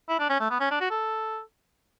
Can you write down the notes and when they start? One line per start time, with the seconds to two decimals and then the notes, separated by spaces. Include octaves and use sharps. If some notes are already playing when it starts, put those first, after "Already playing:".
0.09 E4
0.20 D4
0.30 C#4
0.40 A3
0.50 B3
0.60 C#4
0.71 D4
0.81 F#4
0.90 A4